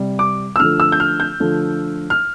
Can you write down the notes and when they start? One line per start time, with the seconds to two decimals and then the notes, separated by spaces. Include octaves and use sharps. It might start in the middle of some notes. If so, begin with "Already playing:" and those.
Already playing: C3 G3
0.19 D6
0.56 E6
0.59 D3 F3 A3 F6
0.80 E6
0.92 G6
1.00 F6
1.20 G6
1.40 D3 F3 A3
2.10 F6